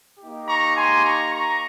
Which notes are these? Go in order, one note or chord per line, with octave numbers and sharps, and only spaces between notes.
A#3 D#4 G4
A#5 C#6
G#5 C6
A#5 C#6
A#5 C#6